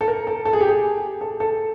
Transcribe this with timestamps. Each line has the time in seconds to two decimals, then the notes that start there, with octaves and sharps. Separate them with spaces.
0.01 A4
0.08 A#4
0.27 A4
0.45 A4
0.53 G#4
0.61 G4
0.68 G#4
1.21 A4
1.40 A4